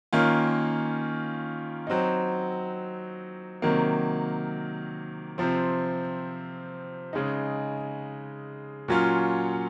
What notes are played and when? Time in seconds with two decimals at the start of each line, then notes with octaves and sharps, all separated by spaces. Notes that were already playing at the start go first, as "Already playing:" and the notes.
0.13 D#3 A#3 C#4 F4
1.87 F#3 C4 D#4
3.62 C3 D#3 F#3 A#3
5.38 C3 F3 C4
7.13 C#3 G#3 D#4
8.88 A#2 F#3 C#4 F4